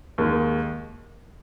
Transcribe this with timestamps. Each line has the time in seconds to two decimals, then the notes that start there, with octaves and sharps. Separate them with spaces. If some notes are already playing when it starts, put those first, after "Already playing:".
0.18 D#2 D#3 G#3